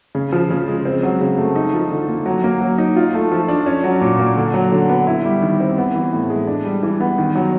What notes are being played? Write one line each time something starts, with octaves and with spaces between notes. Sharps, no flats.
C#3
F3
C#3
G#3
C4
F#3
C#3
A3
D#4
F3
D3
A#3
F#3
A#3
F#3
D#4
F4
A3
F3
D4
C#4
F#3
A#2
A#3
D3
F#3
D3
B3
E4
G3
D#3
C4
B3
E3
A2
G#3
D4
G3
E3
B3
D#3
F#3